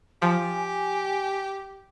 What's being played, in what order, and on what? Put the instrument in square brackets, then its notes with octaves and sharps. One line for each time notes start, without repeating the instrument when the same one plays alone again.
[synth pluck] F3 [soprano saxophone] G4 [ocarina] G#5